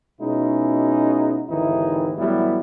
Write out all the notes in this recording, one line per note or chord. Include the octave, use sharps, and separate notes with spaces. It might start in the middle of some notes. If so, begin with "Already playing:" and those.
B2 G#3 C#4 D#4 E4 F#4
G#1 D#2 D3 E3 D#4 E4
A1 E3 F#3 G3 B3 E4